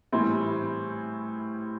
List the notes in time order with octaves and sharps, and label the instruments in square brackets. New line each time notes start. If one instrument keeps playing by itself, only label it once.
[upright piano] A2 E3 G3 C4